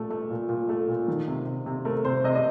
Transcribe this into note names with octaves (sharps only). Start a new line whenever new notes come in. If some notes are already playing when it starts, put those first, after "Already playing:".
Already playing: A#2 A3
A3
A#2
A#2
A3
A#2
D#3
C3
C3
C3
A3 A#4
C3 C5
C3 D#5
D#5